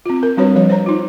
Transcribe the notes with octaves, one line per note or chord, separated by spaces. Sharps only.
C4 F4
A#4
G3 C4 D4 F#4 B4 C#5
F3 G3 C#5
C5 C#5 A#5
D#4 F4